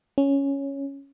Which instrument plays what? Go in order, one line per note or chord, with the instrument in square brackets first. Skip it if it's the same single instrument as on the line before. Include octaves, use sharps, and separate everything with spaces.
[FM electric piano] C#4